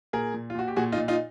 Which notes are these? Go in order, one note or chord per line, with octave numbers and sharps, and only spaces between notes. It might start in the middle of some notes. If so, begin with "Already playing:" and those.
A#2 G#4 A#4
A#2
F4
A#2 F#4
G4
A#2 F#4 G#4
D#4 F4
A#2
D#4 F4